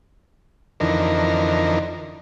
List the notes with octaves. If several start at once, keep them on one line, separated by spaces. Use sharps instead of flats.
F2 D3 E3 D#4 A#4